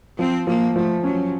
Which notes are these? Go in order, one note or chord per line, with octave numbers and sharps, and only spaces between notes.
F3 C4
F3 A#3
F3 A3
F#3 C#4